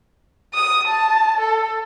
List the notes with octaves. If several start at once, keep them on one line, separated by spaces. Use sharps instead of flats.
D#6
A5
A4